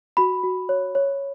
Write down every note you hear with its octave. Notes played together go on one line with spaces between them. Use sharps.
F#4 B5
F#4
C#5
C#5